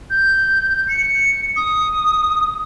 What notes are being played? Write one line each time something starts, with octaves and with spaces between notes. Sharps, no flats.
G6
C#7
D#6